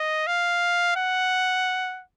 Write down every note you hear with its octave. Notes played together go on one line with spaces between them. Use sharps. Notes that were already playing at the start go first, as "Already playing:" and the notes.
Already playing: D#5
F5
F#5